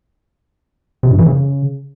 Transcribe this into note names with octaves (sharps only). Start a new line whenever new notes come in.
C3
G2
E3
C#3